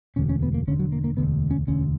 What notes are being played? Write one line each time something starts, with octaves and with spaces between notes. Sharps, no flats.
E1 D2 D3 C#4
C#4
B3
A#3
E1 D2 D3 C#4
F#3
A#3
A#3
E1 D2 D3 B3
C#4
E1 D2 D3 C#4